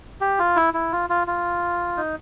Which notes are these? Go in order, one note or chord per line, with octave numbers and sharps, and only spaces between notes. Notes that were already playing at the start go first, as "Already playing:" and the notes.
G4
F4
E4
E4
F4
F4
F4
D#4